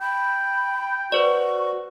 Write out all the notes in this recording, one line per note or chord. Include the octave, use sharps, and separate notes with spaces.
G5 B5
F#4 B4 C5 D5 C#6